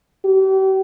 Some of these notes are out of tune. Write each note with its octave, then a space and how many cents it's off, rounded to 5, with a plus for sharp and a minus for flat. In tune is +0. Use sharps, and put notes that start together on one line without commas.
G4 -40